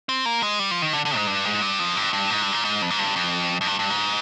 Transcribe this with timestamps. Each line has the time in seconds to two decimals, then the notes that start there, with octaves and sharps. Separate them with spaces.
0.09 C4
0.25 A#3
0.43 G#3
0.59 G3
0.71 F3
0.82 D#3
0.93 D3
1.05 D3
1.16 G#2
1.27 G2
1.45 G#2
1.62 G2
1.79 F2
1.96 G2
2.13 G2
2.30 G#2
2.42 G2
2.53 A#2
2.65 G#2
2.82 F2
2.90 G#2
2.99 G2
3.16 F2
3.61 F2
3.67 G2
3.79 G2
3.90 G#2